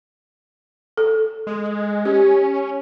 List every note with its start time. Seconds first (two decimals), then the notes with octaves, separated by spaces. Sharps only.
0.97 A4
1.47 G#3
2.05 C#4 G4